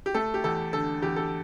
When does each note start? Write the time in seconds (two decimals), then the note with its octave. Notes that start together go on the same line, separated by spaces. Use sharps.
0.06 G4
0.14 A3 A4
0.34 G4
0.44 E2 A4
0.73 D3 A4
1.02 E2 G4
1.16 A4